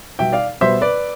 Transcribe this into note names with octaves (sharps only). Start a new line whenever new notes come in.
B2 G3 B3 E5 G5
D5 F5
B2 G3 B3 C5 E5
B4 D5